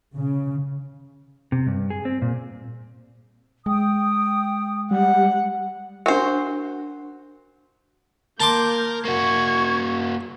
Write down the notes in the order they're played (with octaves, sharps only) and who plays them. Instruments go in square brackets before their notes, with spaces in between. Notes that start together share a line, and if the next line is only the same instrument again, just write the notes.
[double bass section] C#3
[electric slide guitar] C3
G2
G#4
C4
A#2
[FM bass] G#3 [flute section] G5 D#6
[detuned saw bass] G3 [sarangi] F#5
[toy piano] D4 A#4 [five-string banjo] F#4 C5
[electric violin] A#3 G6 [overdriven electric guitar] A#4 [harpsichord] A5 C6 D6
[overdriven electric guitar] A#3 F#4 [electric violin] C#6 G#6